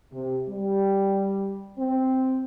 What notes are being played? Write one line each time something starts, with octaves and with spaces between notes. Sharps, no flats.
C3
G3
C4